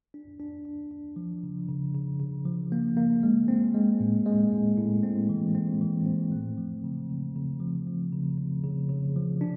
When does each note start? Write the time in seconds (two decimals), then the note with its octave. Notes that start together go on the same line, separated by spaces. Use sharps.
0.14 D4
0.40 D4
0.65 D4
0.91 D4
1.16 F3
1.43 C#3
1.69 C#3
1.95 C#3
2.20 C#3
2.45 F3
2.72 A#3
2.97 A#3
3.23 G#3
3.48 C4
3.74 G#3
4.00 A2
4.26 G#3
4.52 A2
4.77 A2
5.03 C4
5.29 E3
5.55 C4
5.81 E3
6.06 C4
6.32 A3
6.57 F3
6.84 C#3
7.09 C#3
7.36 C#3
7.60 F3
7.87 F3
8.12 C#3
8.38 C#3
8.64 C#3
8.89 C#3
9.16 F3
9.41 D4